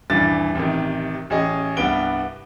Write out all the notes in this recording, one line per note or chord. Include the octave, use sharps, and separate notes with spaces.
D#1 G2 E3 D4 A6
A1 C3 D#3
A1 C#4 G#4 D#5
C2 G2 B3 D7 G7